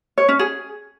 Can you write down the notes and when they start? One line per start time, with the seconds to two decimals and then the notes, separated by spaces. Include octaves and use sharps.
0.18 C#5
0.28 C#4
0.39 G#4